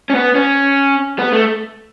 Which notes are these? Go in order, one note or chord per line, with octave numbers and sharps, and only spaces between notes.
C#4
B3
C#4
B3
A3